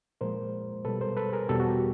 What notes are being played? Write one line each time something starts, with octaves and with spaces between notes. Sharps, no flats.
A#2 F3 G#3 A#4 C5
B2 G3 A4 B4
A#4 C5
A4 B4
G#4 A#4
E2 B2 G3 G4 A4
F#4 G#4
G4